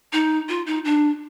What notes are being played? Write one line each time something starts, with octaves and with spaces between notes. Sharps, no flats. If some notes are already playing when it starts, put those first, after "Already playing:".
D#4
F4
D#4
D4